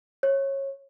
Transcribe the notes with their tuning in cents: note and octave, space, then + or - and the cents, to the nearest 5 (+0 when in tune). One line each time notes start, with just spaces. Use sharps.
C#5 -20